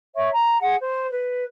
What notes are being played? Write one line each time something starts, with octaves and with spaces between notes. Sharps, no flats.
C#5 E5 C#6
A#5
G#4 F#5
C5
B4